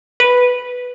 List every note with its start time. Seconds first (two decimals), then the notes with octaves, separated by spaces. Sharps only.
0.20 B4